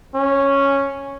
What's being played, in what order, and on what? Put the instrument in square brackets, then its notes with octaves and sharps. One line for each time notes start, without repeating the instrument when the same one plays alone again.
[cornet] C#4